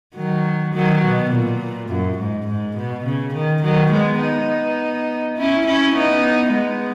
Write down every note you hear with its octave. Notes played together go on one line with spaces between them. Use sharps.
D#3 F#3
D#3 F#3
B2
A#2
F#2
G#2
G#2
B2
C#3
D#3
D#3 F#3
G#3 B3
B3 D#4
C#4 E4
C#4 E4
B3 D#4
G#3 B3